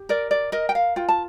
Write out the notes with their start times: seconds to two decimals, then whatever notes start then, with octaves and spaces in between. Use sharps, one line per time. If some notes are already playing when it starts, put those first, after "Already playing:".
Already playing: G4
0.09 A#4 D5
0.31 D5
0.52 A#4 D#5
0.69 G5
0.75 F5
0.96 F4 G5
1.09 A5